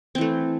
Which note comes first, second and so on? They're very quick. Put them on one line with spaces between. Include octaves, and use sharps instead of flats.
C4 E3 A3